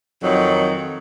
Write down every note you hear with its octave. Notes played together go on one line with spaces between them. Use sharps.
F2 D#3 F#3